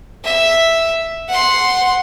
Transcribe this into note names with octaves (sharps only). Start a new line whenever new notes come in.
E5
F#5 C6